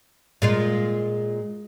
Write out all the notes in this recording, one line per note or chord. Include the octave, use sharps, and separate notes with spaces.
A#2 G#3 F4